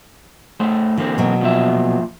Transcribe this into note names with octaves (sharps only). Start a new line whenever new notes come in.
A2 A3 C5
D3 E3 A#3 C4
B2 F#3
A#2 F3 E5